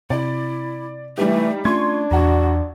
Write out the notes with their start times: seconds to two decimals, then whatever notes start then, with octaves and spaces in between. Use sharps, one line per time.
0.10 C3 E4 D5
1.18 E3 G3 A3 D#4 G4
1.65 A3 C#4 D4 F4 C6 C#6 G#6
2.11 A#1 E2 F#4 F#5 A#5